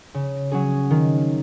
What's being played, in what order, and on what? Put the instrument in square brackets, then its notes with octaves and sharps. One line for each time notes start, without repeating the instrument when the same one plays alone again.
[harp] C#3
F#3 C#4 G#4
D#3